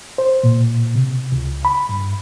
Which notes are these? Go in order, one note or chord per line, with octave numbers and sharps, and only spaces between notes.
C5
A#2
C3
C#2
B5
G2